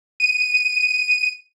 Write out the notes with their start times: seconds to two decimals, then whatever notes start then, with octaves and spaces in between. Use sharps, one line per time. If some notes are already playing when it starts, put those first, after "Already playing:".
0.20 D#7